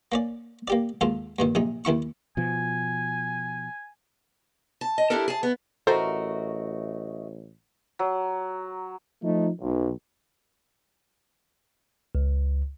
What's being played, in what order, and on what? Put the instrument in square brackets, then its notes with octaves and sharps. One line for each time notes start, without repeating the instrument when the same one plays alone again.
[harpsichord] A#3 C#4 D5
A#3 G4 D5
D#2 G#2 F4 A4
G2 A#2 D#3
A#1 C3 D#4
D#2 D#3 E4 C#6
[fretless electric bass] B2 F3 [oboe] G#5
[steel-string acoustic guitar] A5
D#5
D4 E4 G4 A4 A#4
G#4 A5
B3
[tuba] A1 [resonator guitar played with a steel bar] A3 F#4 A#4 [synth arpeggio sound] A4 C5 [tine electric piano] D#5 E5
[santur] F#3
[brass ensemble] F3 A3 D#4
B1
[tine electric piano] C#2